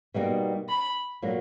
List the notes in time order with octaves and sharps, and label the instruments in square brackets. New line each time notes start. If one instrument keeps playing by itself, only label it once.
[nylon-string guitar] B2 G3 A#3 D#4
[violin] B5
[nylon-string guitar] A#2 F#3 A#3